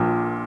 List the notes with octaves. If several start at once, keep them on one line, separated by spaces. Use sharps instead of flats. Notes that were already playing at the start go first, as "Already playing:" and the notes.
Already playing: A#1 A#2